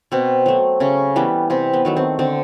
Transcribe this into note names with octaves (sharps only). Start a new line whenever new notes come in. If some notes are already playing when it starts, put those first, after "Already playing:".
B2 C4
F#3 A3
C#3 C#4
E3 G3 B3
C3 C4
B3
D#3 F#3 A3
C4
D3 C4